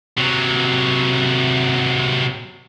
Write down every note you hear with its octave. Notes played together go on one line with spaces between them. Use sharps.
C3 F#3